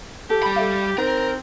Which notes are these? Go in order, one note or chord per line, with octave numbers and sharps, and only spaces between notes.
G4 A4
G3 B5
A4 E5 F5
C4 D#4 A#4